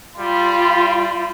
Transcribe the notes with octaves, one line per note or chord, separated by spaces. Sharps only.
G3 F4